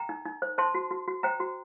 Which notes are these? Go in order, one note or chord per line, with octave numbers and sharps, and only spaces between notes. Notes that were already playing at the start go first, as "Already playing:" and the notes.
Already playing: G5 A#5
D#4
D#4
C5
C5 A5 C6
F#4
F#4
F#4
C5 G5 A#5
F#4